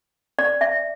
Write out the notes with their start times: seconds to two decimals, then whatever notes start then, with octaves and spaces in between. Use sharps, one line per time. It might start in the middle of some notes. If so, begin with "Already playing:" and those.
0.39 D5
0.61 E5